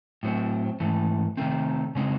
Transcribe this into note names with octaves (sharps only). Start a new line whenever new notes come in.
A2 F#3 C4
G#2 E3 A3
C3 D#3 A3 C4
C#3 G#3 C4 D#4